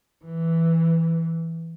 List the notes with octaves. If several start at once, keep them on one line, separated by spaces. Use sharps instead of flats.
E3